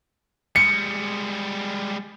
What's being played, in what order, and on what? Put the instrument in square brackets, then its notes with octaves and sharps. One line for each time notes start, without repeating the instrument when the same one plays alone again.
[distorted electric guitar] G3 G#3 [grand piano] C#7